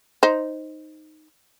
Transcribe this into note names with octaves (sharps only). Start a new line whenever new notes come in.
D#4 C5